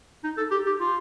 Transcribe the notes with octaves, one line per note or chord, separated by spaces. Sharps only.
D#4
A4
G4
G4
F4